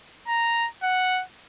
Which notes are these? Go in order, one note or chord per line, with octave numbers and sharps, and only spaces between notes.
A#5
F#5